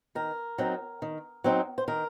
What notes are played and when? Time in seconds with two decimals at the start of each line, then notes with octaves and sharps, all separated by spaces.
0.15 D#3 A#4
0.58 F#3 C4 D#4
1.02 D#3
1.44 F#3 C4 D#4
1.78 C5
1.88 D#3 A#4